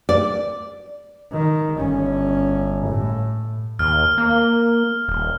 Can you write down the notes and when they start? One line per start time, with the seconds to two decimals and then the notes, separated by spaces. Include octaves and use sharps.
0.09 D5
1.32 D#3
1.77 G1 C#4
2.87 A2
3.79 D#2 F6
4.18 A#3
5.08 D#1